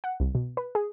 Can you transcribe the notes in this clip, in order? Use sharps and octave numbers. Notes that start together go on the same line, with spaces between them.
F#5
C2
B2
B4
G#4